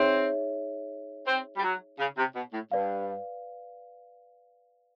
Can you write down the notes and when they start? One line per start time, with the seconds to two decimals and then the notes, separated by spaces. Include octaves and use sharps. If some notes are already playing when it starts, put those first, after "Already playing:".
Already playing: C4 D#4 G#4 C#5 E5
1.27 C4
1.57 G3
1.63 F#3
1.99 C#3
2.17 C3
2.35 B2
2.53 A2
2.71 G2 B4 D5 F5